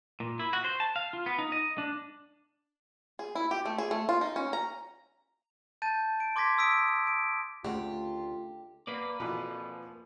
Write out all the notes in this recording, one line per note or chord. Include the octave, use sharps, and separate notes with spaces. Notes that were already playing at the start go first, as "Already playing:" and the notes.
A#2
E4
F#4
C5
A5
F5
F4
B3
D#4
D#5
D4
G#4
E4
G4
A3
G#4
A3
F4
D#4
C#4
A#5
A5 G6 A6 D#7
D7
C6 D6 G#6 A#6 B6
D#6 E6 B6 D7
D7
D2 C#3 C4 F4 G4 F#5
A#3 B3 B4 D5
F2 B2 E3 F3